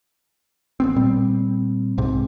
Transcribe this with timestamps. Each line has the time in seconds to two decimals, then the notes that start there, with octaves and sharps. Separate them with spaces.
0.80 A1 B3 C4
0.96 A#2 G3 C4
1.98 B1 G#2 C3